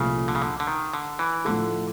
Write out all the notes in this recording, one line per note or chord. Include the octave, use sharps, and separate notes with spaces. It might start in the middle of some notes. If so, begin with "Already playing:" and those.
Already playing: C2 A#2 C#3 F3 A3
D3
C#3
D3
D3
D#3
D3
E3
A2 D3 F3 A3